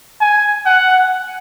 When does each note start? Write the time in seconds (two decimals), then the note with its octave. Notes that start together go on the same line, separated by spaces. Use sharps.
0.21 G#5
0.65 F#5